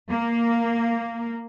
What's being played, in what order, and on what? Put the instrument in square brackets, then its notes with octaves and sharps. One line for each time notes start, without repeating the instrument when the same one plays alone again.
[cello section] A#3